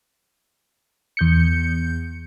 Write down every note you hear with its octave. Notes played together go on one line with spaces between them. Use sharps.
E2 G6 C#7